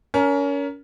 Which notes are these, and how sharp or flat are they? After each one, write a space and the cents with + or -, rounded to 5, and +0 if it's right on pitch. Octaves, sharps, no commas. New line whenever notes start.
C#4 +30 A#4 +5